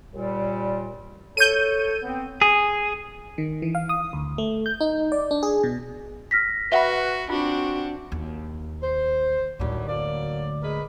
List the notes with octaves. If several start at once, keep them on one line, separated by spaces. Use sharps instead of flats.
D#2 A#2 G3
A4 C#5 G6 D#7
B3 C4
G#4
D#3
E3
F5
D#6
D2
A3
G6
D#4
D5
D4
G#4
B2
F6 A#6 B6
F#4 B4 E5 F#5 B5
C4 D4 F4 F#4 F#5
D#2
C5
D2 A2 D#3 F#3 G3
F#3 A#3 D5
G#3 A#4 B4